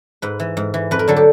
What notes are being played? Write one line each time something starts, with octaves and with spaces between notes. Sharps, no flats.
G#2 B4
E3
G#2
E3
F2 B4
A#4
D3 F#3 A4
G4